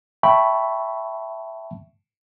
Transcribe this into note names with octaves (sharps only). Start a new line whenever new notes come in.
E5 G5 A5 B5 C#6